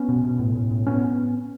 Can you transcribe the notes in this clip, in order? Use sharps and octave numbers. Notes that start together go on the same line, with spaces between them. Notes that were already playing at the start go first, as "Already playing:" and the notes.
Already playing: B3 C#4
B2
B2
A2
A2
A2
A2 B3 C#4